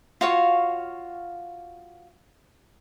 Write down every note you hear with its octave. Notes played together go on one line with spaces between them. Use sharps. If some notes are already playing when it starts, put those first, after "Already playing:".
F4 F#4 C#5 F5